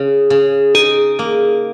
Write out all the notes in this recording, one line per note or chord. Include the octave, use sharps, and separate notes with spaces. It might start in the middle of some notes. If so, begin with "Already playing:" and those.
Already playing: C#3
C#3
D#4 G#4
A#3